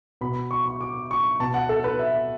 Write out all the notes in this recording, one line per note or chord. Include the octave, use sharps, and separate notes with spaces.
B2 B5
C#6
C#6
D6
C#6
B2 A5
F#5
A4
B4
E5